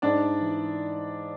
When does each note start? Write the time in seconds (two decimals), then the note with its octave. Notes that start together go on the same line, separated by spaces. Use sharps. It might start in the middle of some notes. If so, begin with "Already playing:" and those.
0.02 G#2 D4 D5
0.41 E3